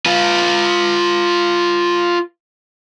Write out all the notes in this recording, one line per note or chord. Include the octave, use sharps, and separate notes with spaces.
F4 B4